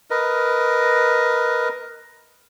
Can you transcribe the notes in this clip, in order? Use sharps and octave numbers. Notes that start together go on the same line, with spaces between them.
A#4 B4 D#5